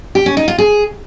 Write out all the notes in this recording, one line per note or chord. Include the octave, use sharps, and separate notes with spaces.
G4
C#4
D#4
F4
G#4